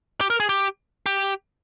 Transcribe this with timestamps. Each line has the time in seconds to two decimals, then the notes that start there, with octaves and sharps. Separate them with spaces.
0.21 G4
0.30 A#4
0.40 G#4
0.49 G4
1.06 G4